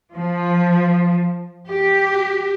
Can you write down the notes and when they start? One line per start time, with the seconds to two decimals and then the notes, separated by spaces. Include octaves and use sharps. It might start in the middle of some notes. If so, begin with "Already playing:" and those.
0.15 F3
1.67 G4